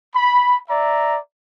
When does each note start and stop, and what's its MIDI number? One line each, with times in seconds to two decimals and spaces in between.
0.16 0.57 83
0.70 1.18 74
0.70 1.18 76
0.70 1.18 82